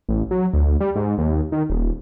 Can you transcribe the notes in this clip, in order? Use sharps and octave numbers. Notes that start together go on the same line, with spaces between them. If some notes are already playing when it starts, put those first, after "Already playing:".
A1
F#3
D2
G3
G#2
D#2
D#3
D#1